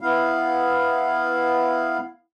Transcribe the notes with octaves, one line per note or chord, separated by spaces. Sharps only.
B3 E4 F5